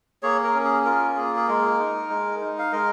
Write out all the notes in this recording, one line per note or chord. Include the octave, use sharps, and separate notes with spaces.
A#3 G#4 C#5
A#4
C#4
G#4
F4 A#4
A#3 G#4
G#4
G#3 A#4
D#4
G#3
D#4
F5
G#3 A#4 D#5